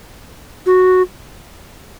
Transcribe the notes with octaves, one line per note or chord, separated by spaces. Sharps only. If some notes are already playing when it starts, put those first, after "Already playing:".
F#4